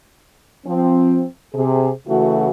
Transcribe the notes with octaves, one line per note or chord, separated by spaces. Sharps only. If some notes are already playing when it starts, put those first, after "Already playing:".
F3 C4
C3 G#4
C#3 E3 A3 E4 F#4